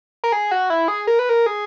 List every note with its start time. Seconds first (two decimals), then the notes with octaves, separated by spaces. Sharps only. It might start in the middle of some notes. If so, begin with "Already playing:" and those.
0.24 A#4
0.32 G#4
0.51 F#4
0.70 E4
0.88 G#4
1.07 A#4
1.19 B4
1.29 A#4
1.46 G#4